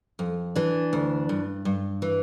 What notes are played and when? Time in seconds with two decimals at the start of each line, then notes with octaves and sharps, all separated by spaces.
0.19 F2
0.56 E3 D4
0.93 D2
1.29 G2
1.65 G2
2.02 E3